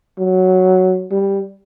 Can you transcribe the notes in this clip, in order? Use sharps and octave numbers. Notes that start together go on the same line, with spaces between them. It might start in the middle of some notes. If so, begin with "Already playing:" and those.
F#3
G3